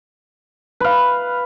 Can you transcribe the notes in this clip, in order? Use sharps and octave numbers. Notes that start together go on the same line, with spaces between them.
B4 F5